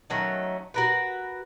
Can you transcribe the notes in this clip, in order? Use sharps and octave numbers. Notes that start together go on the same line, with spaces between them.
D#3 F#3 A3 C#4
F#4 A#4 B4